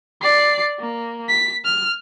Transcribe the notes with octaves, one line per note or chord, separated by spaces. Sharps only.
D5 C7
A#3
B6
F6